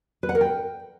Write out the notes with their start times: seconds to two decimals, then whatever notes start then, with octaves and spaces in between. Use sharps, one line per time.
0.23 B4
0.29 F#5
0.35 A#4
0.41 G5